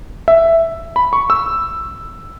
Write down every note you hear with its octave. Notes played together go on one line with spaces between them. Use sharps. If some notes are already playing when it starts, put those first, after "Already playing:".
E5
B5
C#6
E6